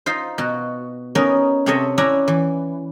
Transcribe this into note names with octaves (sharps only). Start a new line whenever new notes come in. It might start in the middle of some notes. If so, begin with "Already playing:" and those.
D#4 F4 C5
B2 F#4
B3 C#4 D#4 A#4
C3 C4 A4 C#5 D#5 E5
C#4 E4 D5 E5 F#5 A#5
E3